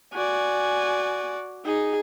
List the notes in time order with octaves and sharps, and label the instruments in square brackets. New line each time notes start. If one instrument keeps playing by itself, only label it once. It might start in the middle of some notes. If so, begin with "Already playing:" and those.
[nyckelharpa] F#4 D5 [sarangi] G#5
[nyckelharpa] D#4 [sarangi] G#4